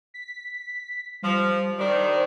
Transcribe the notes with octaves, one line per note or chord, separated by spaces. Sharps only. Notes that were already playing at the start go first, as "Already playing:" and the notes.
B6
F3 G3
D#3 G3 D4 C5